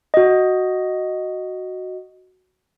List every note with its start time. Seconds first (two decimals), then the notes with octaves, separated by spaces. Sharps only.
0.14 F#4 D#5